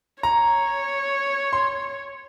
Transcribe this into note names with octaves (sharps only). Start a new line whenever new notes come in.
C#5 A#5
C6